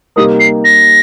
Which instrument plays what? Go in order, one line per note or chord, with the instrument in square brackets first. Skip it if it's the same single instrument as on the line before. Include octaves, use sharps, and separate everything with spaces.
[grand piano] C3 G3 A#3 D#4 A#4 [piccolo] D#6
[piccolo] C7
A#6